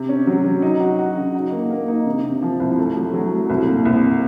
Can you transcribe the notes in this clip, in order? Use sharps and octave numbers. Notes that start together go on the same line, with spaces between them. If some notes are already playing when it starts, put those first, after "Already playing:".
Already playing: C3
C#4
F#3
F#3
D#4
F#4
F#4
C#3
D#4
A#3
A#3
D#4
C3
C3
F3
C2
A3
F#3
F#3
A3
C2
A#2
C2